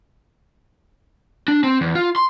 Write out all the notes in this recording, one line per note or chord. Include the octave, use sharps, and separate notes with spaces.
D4
C4
E2
F4
C6